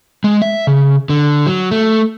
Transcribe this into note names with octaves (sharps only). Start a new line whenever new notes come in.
G#3
E5
C#3
D3
F#3
A3